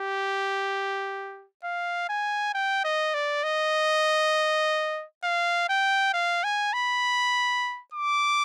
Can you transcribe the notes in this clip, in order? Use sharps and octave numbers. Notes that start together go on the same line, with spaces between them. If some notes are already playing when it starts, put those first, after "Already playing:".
Already playing: G4
F5
G#5
G5
D#5
D5
D#5
F5
G5
F5
G#5
B5
D6